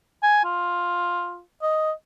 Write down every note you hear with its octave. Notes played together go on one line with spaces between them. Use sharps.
G#5
F4
D#5